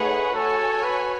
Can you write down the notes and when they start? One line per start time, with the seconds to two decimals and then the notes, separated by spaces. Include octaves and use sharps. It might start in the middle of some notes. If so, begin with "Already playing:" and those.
Already playing: A3 D#4 G#4 B4 C#5 F#5
0.34 F#4 A4 C#5 G#5
0.83 B4